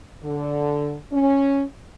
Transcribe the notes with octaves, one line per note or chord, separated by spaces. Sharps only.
D3
C#4